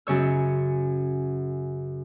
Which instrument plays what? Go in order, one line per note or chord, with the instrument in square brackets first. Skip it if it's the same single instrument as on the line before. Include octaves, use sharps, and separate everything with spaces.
[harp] F#2 C#3 C#5 E6